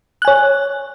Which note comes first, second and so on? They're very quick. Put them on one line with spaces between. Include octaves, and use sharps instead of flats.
F#6 G#5 C#5